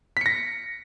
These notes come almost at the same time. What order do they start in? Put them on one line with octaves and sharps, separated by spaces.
B6 C#7 A#6